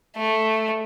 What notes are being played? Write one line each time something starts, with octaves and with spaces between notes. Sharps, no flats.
A3